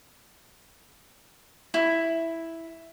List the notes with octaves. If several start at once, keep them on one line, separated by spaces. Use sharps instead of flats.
E4